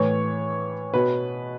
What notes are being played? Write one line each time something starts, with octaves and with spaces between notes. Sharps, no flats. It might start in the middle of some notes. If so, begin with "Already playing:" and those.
Already playing: A2 E3 C#5
B2 B4